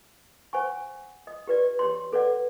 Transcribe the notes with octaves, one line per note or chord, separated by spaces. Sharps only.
C5 F#5 G#5 C#6
D#5 D#6
G4 B4 D5
G4 C#5 C6
A4 B4 C#5 D5 F#5